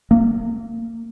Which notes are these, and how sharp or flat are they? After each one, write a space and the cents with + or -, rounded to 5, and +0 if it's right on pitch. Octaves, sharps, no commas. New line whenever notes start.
A#3 -25